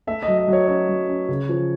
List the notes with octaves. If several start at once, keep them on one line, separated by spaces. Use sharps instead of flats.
A3 E5
D#5
F#3
D#5
F#3 C#5
C#4 C#5
F#3
C#4
C#3
F3